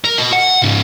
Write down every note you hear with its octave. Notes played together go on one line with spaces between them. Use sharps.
A#4
F#4 D#5
F#5
G#2 C#3